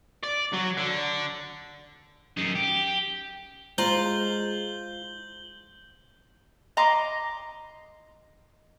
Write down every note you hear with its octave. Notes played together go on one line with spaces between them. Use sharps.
D5
F#3
D3
F#2 D#4
G4
G#3 F4 C5 A#5 G6 F#7 G7
D#5 A#5 C6 D6